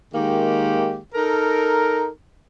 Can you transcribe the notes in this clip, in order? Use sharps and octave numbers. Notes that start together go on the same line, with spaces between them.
D#3 G#3 A#3 G4
D#4 A4 A#4